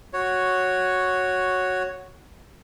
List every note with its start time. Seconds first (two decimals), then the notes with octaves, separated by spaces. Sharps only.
0.13 F#4 C#5